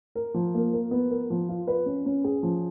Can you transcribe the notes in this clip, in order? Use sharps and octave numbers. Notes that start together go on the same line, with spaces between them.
A#4
F3
A#3
A#4
B3
A#4
F3
F4
B4
C#4
C#4
G#4
F3